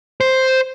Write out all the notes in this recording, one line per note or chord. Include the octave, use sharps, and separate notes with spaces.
C5